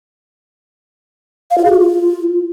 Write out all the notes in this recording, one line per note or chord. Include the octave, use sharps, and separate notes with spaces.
F5
F4
G#4
F#4
F4